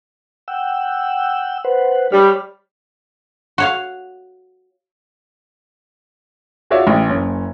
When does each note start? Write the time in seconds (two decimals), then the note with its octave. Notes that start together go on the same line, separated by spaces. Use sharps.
0.48 F#5 G5 E6
1.64 B4 C5 F#5
2.12 G3 C#5 B5 F6
3.58 F#4 C#5 F5
6.70 F4 F#4 G#4 C#5 D5 E5
6.87 A1 C#4
7.10 F#1 C#4